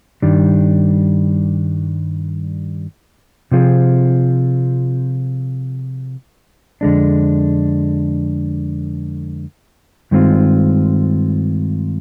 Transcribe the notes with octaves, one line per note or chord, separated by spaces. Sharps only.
G2 D#3 G3 D4
C3 F3 C4 F4 G#4
F2 D3 G#3 D4
G2 D#3 G#3 C4 F4